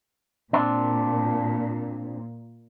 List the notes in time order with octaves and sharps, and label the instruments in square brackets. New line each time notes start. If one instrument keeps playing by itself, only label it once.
[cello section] A#2 [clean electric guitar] C4 D4